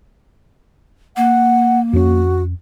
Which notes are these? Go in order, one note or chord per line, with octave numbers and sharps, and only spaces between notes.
A#3 F#5
F2 C#4 F#4